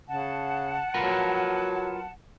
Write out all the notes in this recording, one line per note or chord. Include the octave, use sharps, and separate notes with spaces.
C#3 F#5 A5
F#3 F4 A#4 B4